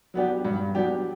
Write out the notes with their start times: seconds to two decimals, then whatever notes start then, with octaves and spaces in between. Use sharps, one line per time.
0.14 F#3 B3 D4 G4
0.45 G2
0.75 F#3 B3 D4 G4